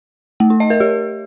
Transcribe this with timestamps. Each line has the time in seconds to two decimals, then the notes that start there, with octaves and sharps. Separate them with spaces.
0.40 A3
0.50 D#4
0.60 D#5
0.70 A#4
0.80 G4